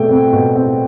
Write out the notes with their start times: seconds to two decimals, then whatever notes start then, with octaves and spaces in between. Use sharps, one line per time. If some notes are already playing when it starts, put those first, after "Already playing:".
Already playing: B2 A3 C4 G5
0.11 C4
0.33 B2
0.55 C4